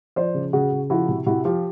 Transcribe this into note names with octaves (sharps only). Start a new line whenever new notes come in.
F3 C5 D5
C#3
C#3 F#4 G#4
C#3
F3 E4 F#4
C3
C3 E4 F#4
F3 F4 G4